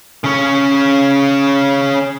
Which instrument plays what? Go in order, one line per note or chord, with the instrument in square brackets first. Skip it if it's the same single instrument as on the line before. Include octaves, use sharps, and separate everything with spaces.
[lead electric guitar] C#3 C#4